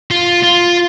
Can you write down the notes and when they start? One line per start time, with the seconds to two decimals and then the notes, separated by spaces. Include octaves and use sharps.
0.11 F4
0.43 F4